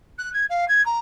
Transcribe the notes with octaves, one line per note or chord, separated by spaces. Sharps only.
F#6
G#6
F5
G#6
A#5